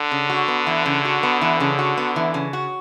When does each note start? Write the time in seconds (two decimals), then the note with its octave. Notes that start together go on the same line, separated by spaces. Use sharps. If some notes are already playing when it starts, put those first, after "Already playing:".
Already playing: D3
0.11 C#3
0.30 F#4
0.48 B3
0.67 E3
0.86 C#3
1.05 F#4
1.23 B3
1.41 E3
1.60 C#3
1.79 F#4
1.98 B3
2.16 E3
2.34 C#3
2.53 F#4